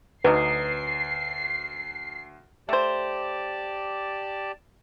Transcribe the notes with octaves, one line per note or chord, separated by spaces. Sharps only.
D2 F#3 D4 D#4 B4 C7
A3 G4 C5 D5 A5